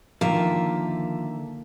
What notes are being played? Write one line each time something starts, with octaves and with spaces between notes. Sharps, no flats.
D3 D#3 F3 A#3 E5